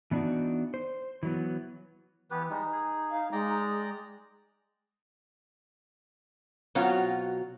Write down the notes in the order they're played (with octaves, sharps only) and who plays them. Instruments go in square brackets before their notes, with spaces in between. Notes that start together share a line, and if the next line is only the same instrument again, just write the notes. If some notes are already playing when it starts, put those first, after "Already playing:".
[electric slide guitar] E3 B3 D4 D#4 F#4
C5
E3 F#3 B3
[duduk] E3 [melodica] B3 G4 B4
[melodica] G3 G#3 [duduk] D#4
[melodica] G#4
[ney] F5
[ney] G#3 [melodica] D5 G5 A#5
[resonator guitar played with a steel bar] B2 F#3 C4 F4 F#4 C#5